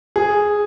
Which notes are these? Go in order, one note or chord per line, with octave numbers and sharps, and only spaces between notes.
G#4